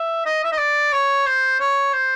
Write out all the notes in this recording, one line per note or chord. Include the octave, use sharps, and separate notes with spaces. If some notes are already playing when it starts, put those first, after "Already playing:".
Already playing: E5
D#5
E5
D#5
D5
C#5
C5
C#5
C5